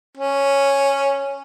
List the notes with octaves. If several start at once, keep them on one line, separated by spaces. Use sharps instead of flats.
C#4